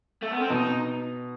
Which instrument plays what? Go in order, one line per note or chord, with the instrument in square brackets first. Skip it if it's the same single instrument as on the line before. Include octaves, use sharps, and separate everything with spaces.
[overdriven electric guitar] A3
B3
C4
[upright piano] B2 [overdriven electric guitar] D#4